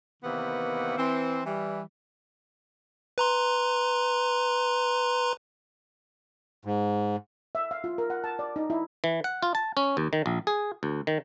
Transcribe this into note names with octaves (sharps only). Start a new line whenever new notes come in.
C3 D#3 E3 A#3 B3
E3 C4
E3 G3
B4 A#5 C6
G#2
E5
F5
F4
A#4
F#5
A5
D5
D#4
E4
E3
F#5
F4
A5
C#4
D#2
D#3
A#1
G#4
D2
D#3